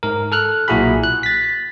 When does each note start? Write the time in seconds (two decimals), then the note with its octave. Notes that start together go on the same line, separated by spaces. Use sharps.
0.03 G#2 A#4
0.32 A4 F6 F#6
0.68 B1 A#2 E4 F#4 G#4 B5
1.04 F#6
1.23 A6 B6